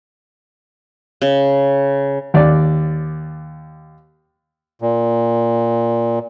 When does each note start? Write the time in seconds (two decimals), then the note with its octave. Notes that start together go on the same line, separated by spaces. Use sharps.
1.22 C#3
2.34 D#2 D5
4.81 A#2